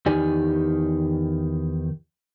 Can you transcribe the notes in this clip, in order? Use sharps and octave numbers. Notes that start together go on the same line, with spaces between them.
E2 D#3 G4 D5 G#5